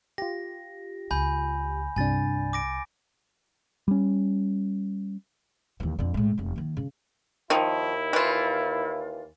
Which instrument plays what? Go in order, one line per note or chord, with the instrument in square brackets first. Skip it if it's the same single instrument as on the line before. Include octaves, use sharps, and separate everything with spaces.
[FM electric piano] F4 G4 [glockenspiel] A#6
[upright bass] C#2 [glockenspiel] G#5 B5 G6
[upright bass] C2 [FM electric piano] G2 C3 D4 [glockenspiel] G#5 A6
[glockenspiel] D6 A#6 D7
[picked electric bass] G3 C#4
[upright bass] D#2 E3
F2 D3
A2 G#3
F1 E2
D#3 A#3
C#3
[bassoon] D#2 [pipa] D#3 F3 [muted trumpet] E4
[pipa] E3 F4